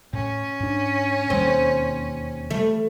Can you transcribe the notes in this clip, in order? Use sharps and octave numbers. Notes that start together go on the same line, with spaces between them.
A2 C#4
G#2 D4
E1 D#2 G3 C4
E3 G3 A3